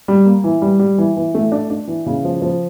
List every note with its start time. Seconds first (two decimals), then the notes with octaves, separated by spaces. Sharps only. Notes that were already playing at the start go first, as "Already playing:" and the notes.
0.08 G3
0.25 A#3
0.44 E3
0.62 G3
0.79 G3
0.98 E3
1.17 E3
1.35 A3
1.52 D4
1.70 D4
1.87 E3
2.06 C#3
2.25 F3
2.42 F3